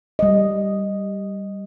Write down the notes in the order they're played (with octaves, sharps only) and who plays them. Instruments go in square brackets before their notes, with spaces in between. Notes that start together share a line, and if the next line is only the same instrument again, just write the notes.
[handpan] G3 D#5